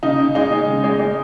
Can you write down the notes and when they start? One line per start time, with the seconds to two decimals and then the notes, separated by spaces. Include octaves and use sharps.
0.03 C#3 D#4
0.20 C#3
0.35 G#3 D#4
0.52 G#3
0.68 C#3
0.84 G#3
1.00 G#3